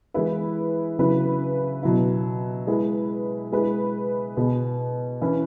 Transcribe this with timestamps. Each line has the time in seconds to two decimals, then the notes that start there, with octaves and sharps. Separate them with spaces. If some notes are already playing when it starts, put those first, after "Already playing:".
0.14 E3 G#3 E4 B4
0.99 C#3 F#3 E4 B4
1.83 B2 F#3 E4
2.67 G#3 E4 B4
3.52 G#3 E4 B4
4.37 B2 B3 G#4
5.21 E3 C#4 E4 B4